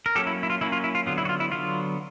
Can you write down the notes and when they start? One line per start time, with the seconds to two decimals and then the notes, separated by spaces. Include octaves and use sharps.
0.06 A#4
0.15 F#3 A#3 C#4 G4 A4
0.27 E4
0.43 E4
0.50 F4
0.61 F#3 A#3 C#4 E4
0.72 F4
0.84 E4
0.95 F4
1.06 D3 F#3 B3 F4
1.18 E4
1.25 F#4
1.29 F4
1.40 E4
1.52 D3 F#3 B3 F4